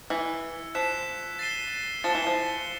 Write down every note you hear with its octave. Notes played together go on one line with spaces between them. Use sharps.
E3 E6 G#6 C#7
F3 F#6 B6 E7
A6 C7 D#7 G7
F3 A6 C#7 E7 G7
E3
F3